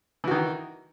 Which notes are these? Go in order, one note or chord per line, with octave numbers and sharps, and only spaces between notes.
D#3 E3 F#4